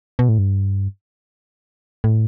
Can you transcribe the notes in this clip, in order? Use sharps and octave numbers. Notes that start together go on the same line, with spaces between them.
B2
A2
G2
A2